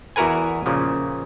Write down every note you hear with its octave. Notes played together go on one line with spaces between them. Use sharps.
E2 E4 F#4 A#4 B4 G#5
A#2 C#3 F3